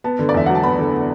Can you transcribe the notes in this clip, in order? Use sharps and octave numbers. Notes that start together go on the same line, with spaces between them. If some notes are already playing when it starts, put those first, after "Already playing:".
B3 A5
D3
D5
E2 E5
F#3 F#5
A5
B3 B5
D3